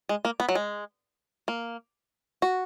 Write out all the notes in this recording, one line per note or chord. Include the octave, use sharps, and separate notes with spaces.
G#3
A#3
B3
F#3
G#3
A#3
F#4